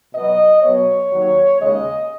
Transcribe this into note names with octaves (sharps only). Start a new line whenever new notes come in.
B2 F#3 B3 D#5
B2 F#3 B3 C#5
D#2 D#3 F#3
D#2 C#3 G#3 D#5